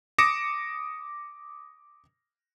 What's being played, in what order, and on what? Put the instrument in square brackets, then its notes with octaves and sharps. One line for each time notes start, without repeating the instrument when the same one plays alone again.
[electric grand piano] D6 D#6 A#6 C#7 D7 E7